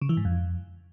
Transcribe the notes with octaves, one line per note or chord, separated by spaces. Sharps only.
C#3
E3
G#2
F2